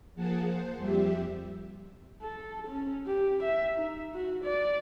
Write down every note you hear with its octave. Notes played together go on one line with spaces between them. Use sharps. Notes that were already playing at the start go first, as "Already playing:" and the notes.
F3 A#3 G#4 F#5 A5
C5
F2 G3 G4 E5
A4
C#4
G4
E5
D#4
F#4
D5